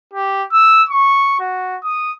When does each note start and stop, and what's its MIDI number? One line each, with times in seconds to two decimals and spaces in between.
0.14 0.43 67
0.52 0.84 88
0.89 1.36 85
1.40 1.77 66
1.84 2.13 87